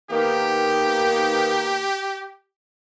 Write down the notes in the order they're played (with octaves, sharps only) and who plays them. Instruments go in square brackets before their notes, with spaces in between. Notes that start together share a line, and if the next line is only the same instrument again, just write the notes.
[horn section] D#3 A#3 B3 [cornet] G4